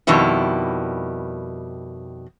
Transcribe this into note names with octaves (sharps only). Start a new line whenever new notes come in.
F2 B2 D#3 G3 E4